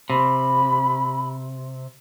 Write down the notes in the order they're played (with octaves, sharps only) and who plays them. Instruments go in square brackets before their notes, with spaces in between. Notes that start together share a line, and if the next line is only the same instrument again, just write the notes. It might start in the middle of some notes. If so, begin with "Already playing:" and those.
[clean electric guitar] C3 [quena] B5